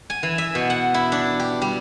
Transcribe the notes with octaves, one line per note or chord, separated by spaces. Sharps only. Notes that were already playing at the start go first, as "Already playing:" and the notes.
G#5
E3
E5
B2
F#5
E4
D4
G4
G3